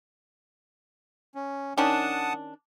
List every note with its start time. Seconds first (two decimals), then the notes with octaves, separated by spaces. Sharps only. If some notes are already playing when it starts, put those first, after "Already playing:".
1.35 C#4
1.78 D#3 C#4 D4 F#5 A5 D#6